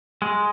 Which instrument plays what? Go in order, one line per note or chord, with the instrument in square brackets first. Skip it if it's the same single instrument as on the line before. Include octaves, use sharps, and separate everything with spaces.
[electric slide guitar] G#3